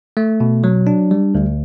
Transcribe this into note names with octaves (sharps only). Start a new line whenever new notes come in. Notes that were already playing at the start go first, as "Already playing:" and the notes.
A3
B2
F#3
D4
G3
D2